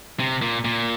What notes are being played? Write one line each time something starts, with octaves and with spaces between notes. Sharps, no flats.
C3
A#2
A#2